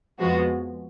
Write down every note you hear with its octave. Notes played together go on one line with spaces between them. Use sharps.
F2 F3 G#3 B3 F#4